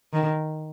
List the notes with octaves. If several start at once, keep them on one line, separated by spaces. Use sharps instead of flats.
D#3